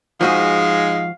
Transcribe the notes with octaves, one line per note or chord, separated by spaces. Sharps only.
G#2 F3 G#3 F#4 G#4 F5